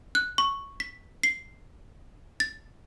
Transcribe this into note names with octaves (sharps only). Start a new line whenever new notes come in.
F#6
C#6
B6
C7
A6